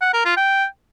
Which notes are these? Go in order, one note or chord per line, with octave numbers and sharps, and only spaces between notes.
F#5
A#4
F4
G5